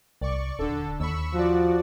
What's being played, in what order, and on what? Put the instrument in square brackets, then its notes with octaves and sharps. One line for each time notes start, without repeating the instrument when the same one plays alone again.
[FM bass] C2 [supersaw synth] D5 C#6
[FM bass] D#1 [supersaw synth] D3 A4
[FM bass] D#2 [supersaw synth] B5 C#6 E6
[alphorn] F3 [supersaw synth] F#4 D5